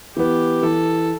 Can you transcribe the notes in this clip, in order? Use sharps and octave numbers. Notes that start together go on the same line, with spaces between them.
E3 B3 G4
E3 A4